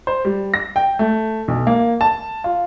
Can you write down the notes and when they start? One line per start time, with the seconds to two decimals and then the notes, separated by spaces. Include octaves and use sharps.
0.07 C5
0.25 G3
0.54 A#6
0.76 G5
0.99 A3
1.48 B1
1.67 A#3
2.01 A5
2.44 F4